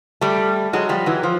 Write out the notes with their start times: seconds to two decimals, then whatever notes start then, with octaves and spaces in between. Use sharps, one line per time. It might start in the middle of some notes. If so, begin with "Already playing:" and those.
0.21 G3 A3
0.73 F#3 G#3
0.89 F3 G3
1.06 E3 F#3
1.23 F3